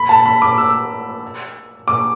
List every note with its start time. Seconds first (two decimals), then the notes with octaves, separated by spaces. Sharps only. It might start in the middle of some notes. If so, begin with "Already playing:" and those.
Already playing: B5
0.09 A5
0.26 B5
0.42 D6
0.58 E6
1.88 D6